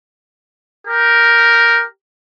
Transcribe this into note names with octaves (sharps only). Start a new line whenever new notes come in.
G4 A#4